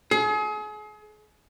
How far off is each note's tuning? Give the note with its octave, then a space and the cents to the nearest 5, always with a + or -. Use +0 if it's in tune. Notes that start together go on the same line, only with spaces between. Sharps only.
G#4 +35